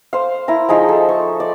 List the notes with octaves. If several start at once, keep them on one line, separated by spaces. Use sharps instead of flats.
C5 F5
E4 A#4 A#5
F3 D#4 G#4 A#5
A4
C#6
D5